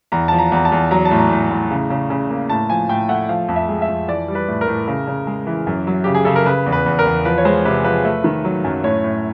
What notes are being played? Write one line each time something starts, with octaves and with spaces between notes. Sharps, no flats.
E2 A#5
F3 A5
A#5
E2 A#5
A5
E2
F#3 A#5
A5
A2
A#5
A2
A2
C#3
C#3
C#3
A#3
A2 A5
F3 G#5
A2 G5
A3 F#5
F3 F5
F2
E5
G#3
E5
F2
E3 D5
G3
B4
A2
A#4
A2
C#3
C#3
G#3
E3
F#2
F#3
C#3 G4
G#4
C#3 A4
A#4
C#3 B4
E2
B4
E2
A#4
E2
F3 B4
C#5
G#3 C5
C3 B4
F3 B4
A3
D#3
F#3
F#2
A2 C#5
A2